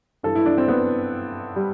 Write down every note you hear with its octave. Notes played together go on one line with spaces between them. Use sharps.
G2 E3 A4
E4
D4
C4
B3
G3